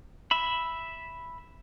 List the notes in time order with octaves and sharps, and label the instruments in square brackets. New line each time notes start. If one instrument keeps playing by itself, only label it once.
[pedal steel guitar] E5 B5